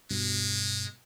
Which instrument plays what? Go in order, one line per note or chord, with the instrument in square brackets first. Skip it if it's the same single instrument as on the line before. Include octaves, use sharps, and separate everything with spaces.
[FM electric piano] G2 B2 [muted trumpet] G#3